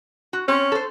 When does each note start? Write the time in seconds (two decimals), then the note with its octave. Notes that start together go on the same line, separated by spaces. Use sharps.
0.33 F#4
0.48 C4 C#4
0.72 A4 C5